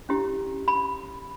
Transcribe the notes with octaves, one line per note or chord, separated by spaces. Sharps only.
C#4 E4 G4
B5